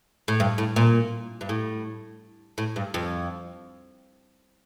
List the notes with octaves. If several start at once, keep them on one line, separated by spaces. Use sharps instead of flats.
A2
G2
A2
A#2
G2
A2
A2
G2
F2